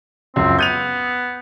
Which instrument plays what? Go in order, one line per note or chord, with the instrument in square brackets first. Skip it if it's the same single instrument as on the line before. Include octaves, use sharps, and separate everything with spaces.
[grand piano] C#2 F#2 F4 [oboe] C4
[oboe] B3 [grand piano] G6 D#7 F7